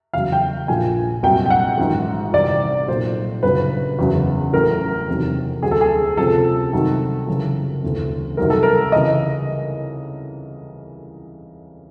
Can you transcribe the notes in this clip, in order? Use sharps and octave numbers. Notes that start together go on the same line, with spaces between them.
E2 C#3 F#3 F5
G5
A#1 A#2 F3 G#5
C2 A#2 F#3 G5
G5
F#5
A1 G#2 D#3 F#3
C2 C3 E3 D5
B1 A#2 F#3 C5
G1 F#2 C#3 F#3 B4
F#1 E2 C#3 F#3
A1 A2 F#3 A#4
F1 E2 C3 D#3 F#3
D2 D3 F#3 G#4
A4
G#4
C#2 C3 F3 A4
C2 C3 D#3 F#3
F#1 F#2 C#3 E3
E1 D2 C#3 E3
C2 C3 D#3 F#3 A#4
A4
A#4
C#3 E3 D#5